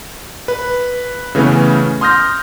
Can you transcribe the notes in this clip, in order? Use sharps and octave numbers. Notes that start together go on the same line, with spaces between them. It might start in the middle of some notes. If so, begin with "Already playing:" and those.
B4
C#3 E3 A3 B3 C#4
C6 D#6 F6 G6 A#6